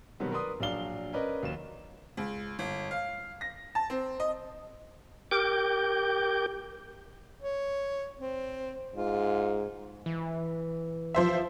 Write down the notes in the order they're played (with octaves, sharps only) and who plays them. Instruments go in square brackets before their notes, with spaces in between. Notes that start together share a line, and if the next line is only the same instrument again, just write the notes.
[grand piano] B2 D#3 F#3 G3 B3 C4
A#4 B4 D5 C6 D#6
A#1 F#3 D4 D5 F5 G7
C#4 A#4 B4 D5 D#5
D#2 F#3 E7
[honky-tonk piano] C#2
G1
F5
A#6
A5
C4
D#5
[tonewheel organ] G4 A#4 G5 D6 G6
[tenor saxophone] C#5
C4
[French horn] G#2 [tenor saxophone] F4
[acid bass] E3
[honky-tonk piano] F3 C5 E5